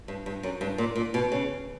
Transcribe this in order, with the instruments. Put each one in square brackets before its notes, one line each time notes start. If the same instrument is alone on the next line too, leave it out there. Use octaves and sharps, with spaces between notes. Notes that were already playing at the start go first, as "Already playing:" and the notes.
[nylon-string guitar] G2
G2
F#2
G2
A#2
A#2
B2
C#3